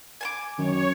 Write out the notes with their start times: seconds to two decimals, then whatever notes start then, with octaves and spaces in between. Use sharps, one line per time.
0.21 G#5 A5 D6
0.58 F#2 D#3 C#5